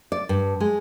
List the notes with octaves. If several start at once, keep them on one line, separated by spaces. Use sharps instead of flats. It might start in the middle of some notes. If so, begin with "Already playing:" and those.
D5
G2
G#3